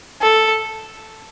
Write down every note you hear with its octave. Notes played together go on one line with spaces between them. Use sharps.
A4